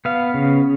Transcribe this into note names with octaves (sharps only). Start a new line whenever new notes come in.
B3 F5
C#3